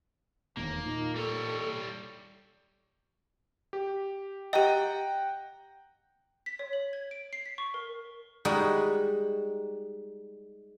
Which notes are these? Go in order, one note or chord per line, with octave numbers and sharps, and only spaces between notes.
E1 D#2 B2 A#3 D#4
A#2 D#4
G3 A4 C#5
G4
G4 D#5 F#5 G5 A#5
B6
C#5
F#7
G#6
D7
C7
B6
C#6
A#4
G3 G#3 D#4 F#4